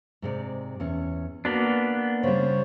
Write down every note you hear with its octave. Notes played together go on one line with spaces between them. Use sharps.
G#2 C3 D5
E2 C#4
A#3 B3 D4 F#4
C#3 G3 C5 C#5